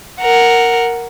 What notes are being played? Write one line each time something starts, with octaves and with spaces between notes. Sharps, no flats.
A#4 F#5